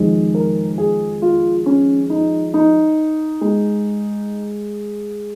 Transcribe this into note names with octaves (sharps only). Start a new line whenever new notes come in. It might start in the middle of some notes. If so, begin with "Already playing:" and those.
Already playing: F2 D#3 G#3
A#4
G#4
F4
C#4
D#4
D#4
G#3